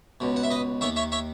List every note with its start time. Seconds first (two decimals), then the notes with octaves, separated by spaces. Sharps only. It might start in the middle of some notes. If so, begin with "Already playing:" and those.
0.20 C#2 B2
0.36 F#5
0.43 E5
0.50 B4 D#5
0.81 D#3 C#5 E5
0.85 D#2
0.96 C#5 E5
1.12 C#5 E5